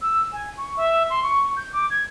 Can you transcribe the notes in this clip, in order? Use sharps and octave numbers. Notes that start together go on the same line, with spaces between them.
E6
G#5
C#6
E5
C6
C#6
G6
D6
G#6